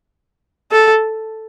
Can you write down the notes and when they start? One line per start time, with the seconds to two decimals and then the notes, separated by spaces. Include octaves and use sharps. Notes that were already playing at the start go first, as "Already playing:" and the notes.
0.72 A4